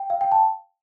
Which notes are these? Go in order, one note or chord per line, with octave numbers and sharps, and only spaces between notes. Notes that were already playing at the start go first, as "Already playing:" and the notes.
Already playing: G5
F5
G5
A5